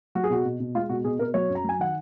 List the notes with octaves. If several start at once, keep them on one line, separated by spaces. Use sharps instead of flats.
F#3 F#4
G#4
B2 F#4
B2
B2
G#3 F4
B2 F#4
B2 G#4
B2 A#4
F#3 C#5
F#2
A#5
F#3 G#5
D#3 F#5